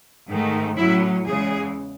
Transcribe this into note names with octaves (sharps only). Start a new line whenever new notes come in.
G#2 D#3 A3
A2 F#3 C#4 E4
E2 C#3 E3 G#3 G#4